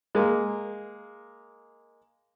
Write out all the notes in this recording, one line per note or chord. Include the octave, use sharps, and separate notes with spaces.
G#3 A#3